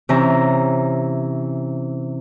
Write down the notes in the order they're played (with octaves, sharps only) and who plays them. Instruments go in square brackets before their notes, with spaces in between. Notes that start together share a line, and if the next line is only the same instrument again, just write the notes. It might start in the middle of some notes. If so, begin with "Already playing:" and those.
[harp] C3 E3 C#4 A#5